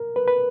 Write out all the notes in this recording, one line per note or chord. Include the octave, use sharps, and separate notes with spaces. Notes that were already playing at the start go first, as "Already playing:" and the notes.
Already playing: A#4
B4
B4